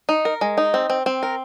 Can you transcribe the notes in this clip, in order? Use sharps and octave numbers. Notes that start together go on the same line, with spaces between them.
D#4
A#4
G#3
D#4
C4
C4
C4
A#4